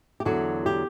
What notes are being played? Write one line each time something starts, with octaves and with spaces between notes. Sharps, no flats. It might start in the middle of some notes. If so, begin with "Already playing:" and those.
G4
E2 D3 F#3 F#4
G4